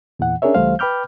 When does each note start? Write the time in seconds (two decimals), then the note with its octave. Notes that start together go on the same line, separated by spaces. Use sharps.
0.19 E2 A#2 E3 F#5
0.42 C#4 D4 G#4 A#4 C#5 E5
0.55 C#2 E3 G3 A3 C5 F5
0.79 B4 G5 B5 D6 F6 G6